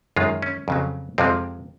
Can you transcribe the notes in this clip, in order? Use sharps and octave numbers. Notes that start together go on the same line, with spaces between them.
F#2 D#3 G#3 F4
C#4
F2 C#3 F#3
F2 C3 F3 G#3 C4